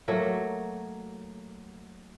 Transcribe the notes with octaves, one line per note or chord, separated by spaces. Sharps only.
F#3 A3 A#3